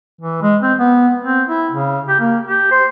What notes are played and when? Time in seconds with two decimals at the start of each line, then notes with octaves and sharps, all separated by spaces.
0.21 E3
0.42 G#3
0.62 C4
0.79 B3
1.24 C4
1.48 E4
1.72 C#3
2.08 G4
2.20 A#3
2.47 G4
2.71 C5